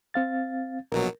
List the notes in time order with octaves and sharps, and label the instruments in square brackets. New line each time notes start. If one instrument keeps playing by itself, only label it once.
[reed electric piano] C4 F5 A6
[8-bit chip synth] A#1 B2 F#3 [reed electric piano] A#4